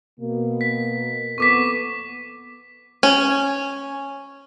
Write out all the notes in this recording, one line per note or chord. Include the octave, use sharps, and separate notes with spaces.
B2 A#3
B6
F2 B3 A4 C#6 D6 B6
C#4